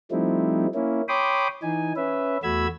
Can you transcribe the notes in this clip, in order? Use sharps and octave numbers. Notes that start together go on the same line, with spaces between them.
F3 G3 A3 C4 D#4 E4
A#3 C#4 E4
C#5 G5 B5 C6 D6 D#6
E3 D#4 G#5
C#4 B4 E5
E2 A3 F#4 B5 E6 G#6